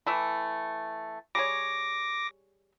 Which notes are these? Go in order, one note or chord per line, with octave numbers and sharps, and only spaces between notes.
E3 A3 E4
G3 G#4 C#5 D6 A#6